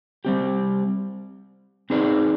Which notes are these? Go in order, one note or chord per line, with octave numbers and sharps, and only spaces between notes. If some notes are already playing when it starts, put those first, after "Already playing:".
G3 C4 G4
C4 D#4 G#4 B4 D5